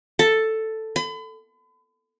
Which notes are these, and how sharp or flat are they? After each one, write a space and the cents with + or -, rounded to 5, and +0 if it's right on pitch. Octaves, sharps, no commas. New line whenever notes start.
A4 +5
B5 +40